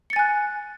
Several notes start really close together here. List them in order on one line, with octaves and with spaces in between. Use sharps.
C#7 A6 G#5 F#6